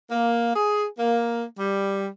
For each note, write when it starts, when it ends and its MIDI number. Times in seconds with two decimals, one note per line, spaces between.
0.10 0.52 58
0.55 0.85 68
0.99 1.43 58
1.57 2.07 55